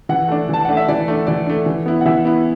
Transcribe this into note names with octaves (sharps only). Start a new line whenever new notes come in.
E3 F#5
A3 D4
E3 A5
A3 D4 F#5
E5
E3 D5
A3 D4
E3 D5
A3 D4
E3
B3 E4
F#5
E3 E5
B3 E4